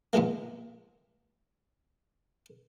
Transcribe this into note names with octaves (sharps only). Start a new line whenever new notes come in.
A#2 D#3 F3 G#3 A#3